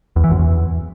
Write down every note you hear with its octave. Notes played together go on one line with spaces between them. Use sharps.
E2
E3
F#2
E2